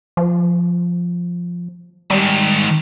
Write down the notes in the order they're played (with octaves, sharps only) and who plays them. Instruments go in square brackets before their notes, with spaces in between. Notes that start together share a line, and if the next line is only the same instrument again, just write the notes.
[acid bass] F3
[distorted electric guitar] G#2 D#3 [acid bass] G3